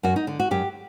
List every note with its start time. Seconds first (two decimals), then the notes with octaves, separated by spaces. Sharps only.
0.03 F#2 F#4
0.16 D#4
0.27 D3
0.40 F#4
0.51 F#2 G4